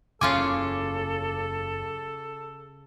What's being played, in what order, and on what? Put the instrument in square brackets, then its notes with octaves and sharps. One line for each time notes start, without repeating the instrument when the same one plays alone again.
[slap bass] F#1 E2 [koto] C#3 F4 G#5 [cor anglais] A4 [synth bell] D6